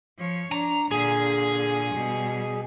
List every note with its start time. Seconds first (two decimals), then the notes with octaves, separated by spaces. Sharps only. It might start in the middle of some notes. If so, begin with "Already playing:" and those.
0.18 F3 C#5
0.52 D4 A#5
0.91 A#2 D3 G#4
1.92 B2 G3